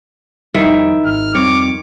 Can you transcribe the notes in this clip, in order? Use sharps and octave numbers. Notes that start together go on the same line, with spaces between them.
F2 D#3 G3 E4 E5
G#1 F6
F2 G3 C4 C#5 D6